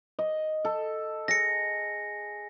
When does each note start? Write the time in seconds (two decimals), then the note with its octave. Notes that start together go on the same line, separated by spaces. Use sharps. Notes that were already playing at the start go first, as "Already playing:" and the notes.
0.19 D#5
0.65 A4
1.28 G#4 A#6 C#7